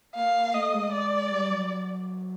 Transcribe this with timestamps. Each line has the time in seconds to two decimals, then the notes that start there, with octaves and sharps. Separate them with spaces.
0.15 A#3 F5
0.54 A3 D#5
0.73 G#3
0.92 D5
1.31 G3
1.50 F#3